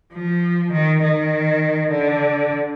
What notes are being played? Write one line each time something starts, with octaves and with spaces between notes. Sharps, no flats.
F3
D#3
D#3
D3